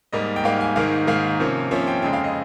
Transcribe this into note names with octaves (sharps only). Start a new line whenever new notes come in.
G#2 G3 A#3 D#5
G5
G#2 G3 A#3 F5
G#5
G#2 D#3 A#3 F5
G#2 D#3 A#3 F5
C3 F3 A#3 C#4
C3 F3 A#3 C#4 C#5
G5
F2 C#3 G#3 G5
F5
D#5